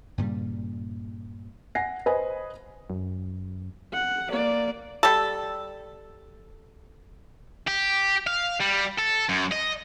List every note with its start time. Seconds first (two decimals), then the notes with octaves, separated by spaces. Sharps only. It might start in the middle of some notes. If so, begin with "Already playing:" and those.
0.18 G2 A#2 C#3 G3
1.75 F#5 G#5 A#6 C7
2.06 B4 C5 D#5 G#5
2.90 F#2
3.93 F#5
4.29 A#3 D5
5.03 G3 A4
7.68 G4
8.27 F5
8.61 G3
8.99 A4
9.29 F#2
9.51 D#5